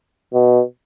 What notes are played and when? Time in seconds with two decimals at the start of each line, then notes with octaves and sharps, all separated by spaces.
0.33 B2